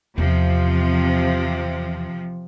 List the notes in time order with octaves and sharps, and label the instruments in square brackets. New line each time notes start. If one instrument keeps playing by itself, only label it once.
[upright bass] E2 [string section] C3 F3